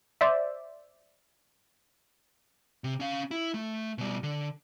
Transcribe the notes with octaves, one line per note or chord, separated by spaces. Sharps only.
C5 D5 E5
C3
C#4 F5
E4
A3
B2 G3
D3